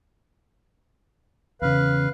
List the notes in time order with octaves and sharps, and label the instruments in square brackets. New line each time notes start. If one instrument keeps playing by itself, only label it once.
[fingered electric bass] E2 C#3 [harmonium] B4 F5